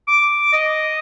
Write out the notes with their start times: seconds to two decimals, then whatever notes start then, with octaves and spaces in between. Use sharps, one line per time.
0.08 D6
0.53 D#5